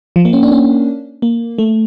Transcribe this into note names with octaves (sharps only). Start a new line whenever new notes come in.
F3
A#3
C#4
D4
C#4
A#3
A3